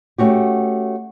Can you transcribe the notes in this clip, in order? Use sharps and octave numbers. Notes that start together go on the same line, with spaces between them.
A3 C#4 F#4 G4